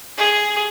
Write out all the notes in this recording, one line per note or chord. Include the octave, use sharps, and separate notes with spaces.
G#4